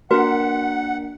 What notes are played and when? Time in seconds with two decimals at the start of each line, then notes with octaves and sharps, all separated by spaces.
0.11 A#3 D4 F#4 A#4 B4 F#5 B6